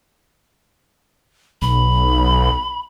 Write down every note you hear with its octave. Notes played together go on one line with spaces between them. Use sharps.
B1 B5